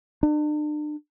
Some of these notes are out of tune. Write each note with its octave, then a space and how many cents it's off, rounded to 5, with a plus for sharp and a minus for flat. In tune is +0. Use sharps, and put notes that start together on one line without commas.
D4 +40